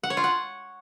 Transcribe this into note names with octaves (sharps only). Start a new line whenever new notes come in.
F#5
C#5
F4
F#5